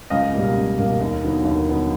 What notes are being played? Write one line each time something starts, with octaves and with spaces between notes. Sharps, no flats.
C#2 D#5 F5
B2 G3 A#3
C#2
B2 G3 A#3
D#2
D3 F#3 B3 D#4
D#2
D3 F#3 B3 D#4